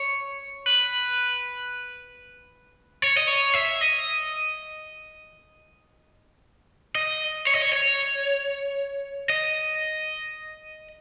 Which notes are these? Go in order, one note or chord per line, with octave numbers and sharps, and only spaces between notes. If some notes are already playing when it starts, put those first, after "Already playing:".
Already playing: C#5
B4
C#5
D#5
C#5
E5
D#5
D#5
C#5
D#5
C#5
C#5
D#5